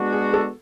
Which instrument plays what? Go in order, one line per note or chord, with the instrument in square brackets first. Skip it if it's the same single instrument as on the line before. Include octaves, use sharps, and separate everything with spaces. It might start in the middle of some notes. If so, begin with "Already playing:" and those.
Already playing: [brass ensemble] G#3 B3 D4 F#4
[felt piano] G#4
A4